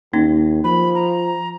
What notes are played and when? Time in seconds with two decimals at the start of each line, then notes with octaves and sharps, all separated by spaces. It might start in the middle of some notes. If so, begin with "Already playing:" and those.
0.13 D#2 A#3 C#4 D#4
0.64 F3 B5
0.95 A#5